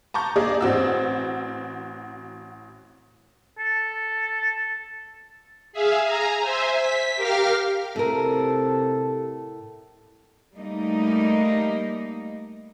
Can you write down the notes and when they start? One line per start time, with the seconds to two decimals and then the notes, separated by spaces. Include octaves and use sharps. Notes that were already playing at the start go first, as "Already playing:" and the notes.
0.14 A5 A#5 C#6 G6
0.36 A#3 G#4 D5 D#5
0.61 A1 C4 F#4 E6
3.59 A4
5.73 G#4 E5 F5
6.03 G#5 A#5
6.41 C5 E5 G#5
6.78 B6
7.16 G4 A#4 F5 F6
7.96 A2 C3 A4 A#4
10.56 G3 A3 A#3 D#4